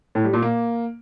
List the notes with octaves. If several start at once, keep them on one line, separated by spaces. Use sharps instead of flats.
A2
G3
A#2
A#3